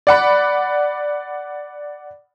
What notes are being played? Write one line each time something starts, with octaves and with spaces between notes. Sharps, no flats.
D5 F#5 B5